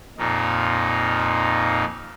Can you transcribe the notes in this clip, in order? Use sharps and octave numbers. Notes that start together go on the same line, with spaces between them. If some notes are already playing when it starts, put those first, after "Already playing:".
F2 A#2 D#4